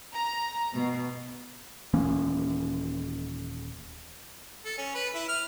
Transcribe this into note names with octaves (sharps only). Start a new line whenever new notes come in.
A#5
B2
D#1 E3 A#3 C#4
A4
C#4
B4
E4
F6